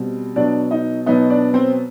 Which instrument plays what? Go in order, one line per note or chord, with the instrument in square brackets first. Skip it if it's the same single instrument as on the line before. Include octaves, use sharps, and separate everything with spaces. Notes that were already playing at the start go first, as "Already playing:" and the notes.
Already playing: [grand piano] B2 G3 C4
B2 F#3 B3 D4 D5
D#4 D#5
B2 F#3 B3 D#4 D#5
D4 D5
C4 C5